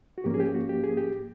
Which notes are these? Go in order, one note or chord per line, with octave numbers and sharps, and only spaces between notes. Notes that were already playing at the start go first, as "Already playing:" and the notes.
F#4
G#2 F3 A#3 C#4 G4
G#4
G4
F#4
G4
G#4
G4